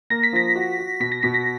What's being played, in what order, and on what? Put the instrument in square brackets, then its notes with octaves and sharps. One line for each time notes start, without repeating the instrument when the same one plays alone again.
[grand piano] A#3 [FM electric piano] A#6
[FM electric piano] B6
[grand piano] F3 [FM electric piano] A#6
[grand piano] F#4
F#4
[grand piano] B2 [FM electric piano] B6
[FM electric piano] A#6
[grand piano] B2 [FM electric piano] B6
[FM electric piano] A#6